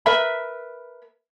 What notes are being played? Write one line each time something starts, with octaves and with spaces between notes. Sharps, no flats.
A#4 B4 E5 B5